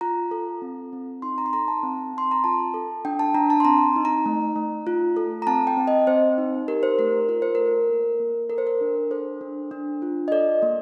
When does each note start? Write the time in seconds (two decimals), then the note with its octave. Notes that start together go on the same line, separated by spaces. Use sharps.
0.01 F4 A#5
0.31 A4
0.62 C4
0.93 C4
1.22 D#4 C6
1.38 A#5
1.46 C6
1.53 A4 A#5
1.68 A5
1.83 C4
2.14 C4 C6
2.31 A#5
2.44 F4 A5
2.74 A4
3.05 D4 G5
3.19 A5
3.34 D4 A#5
3.50 A5
3.60 C6
3.65 C4 A#5
3.96 D#4
4.05 A#5
4.26 A3
4.56 A3
4.87 F4
5.17 A4
5.42 A#5
5.47 C4 A5
5.67 G5
5.77 C4
5.88 D#5
6.07 C4 C5
6.38 D#4
6.68 G4 A#4
6.83 C5
6.99 A3 A#4
7.29 F4 A#4
7.42 C5
7.55 A4 A#4
7.89 A#3
8.20 A#3
8.50 A4 A#4
8.58 C5
8.67 A#4
8.81 D4
9.11 A4 C5
9.41 D4
9.71 D4
10.02 F4
10.28 D#5
10.31 A4 D5
10.62 A#3